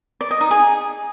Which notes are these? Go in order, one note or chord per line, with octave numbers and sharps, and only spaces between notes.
D5
D#5
D#4
G#4